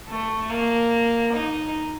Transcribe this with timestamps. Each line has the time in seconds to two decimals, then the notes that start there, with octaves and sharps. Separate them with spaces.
0.09 A3
0.50 A#3
1.33 D#4